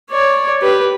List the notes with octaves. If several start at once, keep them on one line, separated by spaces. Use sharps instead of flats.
C#5 D5
G4 B4